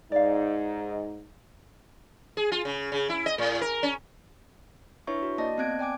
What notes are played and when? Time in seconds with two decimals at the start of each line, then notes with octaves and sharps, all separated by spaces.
0.12 G#2 D#4 D5 F5
2.37 G#4
2.52 F4
2.65 C#3
2.92 C#3
3.09 E4
3.26 D#5
3.38 A2
3.61 A#4
3.83 C#4
5.07 D4 E4 B4 C#5 E5 C#6
5.22 F#4
5.38 A#3 D5 D#5 A5 A#6
5.57 B3 C4 A5 F#6 G#6 D7
5.79 D5 G5 G#5 D6 D7